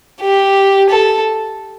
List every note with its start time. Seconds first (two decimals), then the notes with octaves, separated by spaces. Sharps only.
0.21 G4
0.90 A4